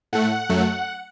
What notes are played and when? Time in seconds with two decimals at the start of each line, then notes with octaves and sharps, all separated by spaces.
0.13 A2 A3 F#5
0.49 F#2 F#3 A3